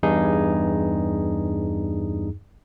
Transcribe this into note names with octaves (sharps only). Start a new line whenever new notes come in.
E2 G2 D#4 G#4